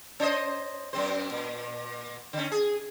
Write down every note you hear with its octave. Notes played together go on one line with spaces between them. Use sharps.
C#4 C5 D#5
F#2 C4 C5
A#2
D3 C#4
G#4